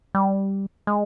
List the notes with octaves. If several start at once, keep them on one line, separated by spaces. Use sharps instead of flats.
G3
G#3